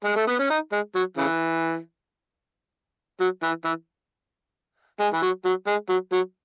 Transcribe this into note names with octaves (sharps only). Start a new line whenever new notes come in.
G#3
A3
B3
C#4
D#4
G#3
F#3
C#3 E3
F#3
E3
E3
G#3
E3
F#3
F#3
G#3
F#3
F#3